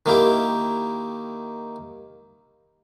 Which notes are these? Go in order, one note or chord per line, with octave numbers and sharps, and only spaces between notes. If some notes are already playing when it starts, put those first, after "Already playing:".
D#3 A#3 E4 G4